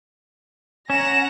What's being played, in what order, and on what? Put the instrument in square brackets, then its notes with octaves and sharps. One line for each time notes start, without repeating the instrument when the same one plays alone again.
[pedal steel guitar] C#4 [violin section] F#5 A#5 A#6 [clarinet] G#5 [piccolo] E7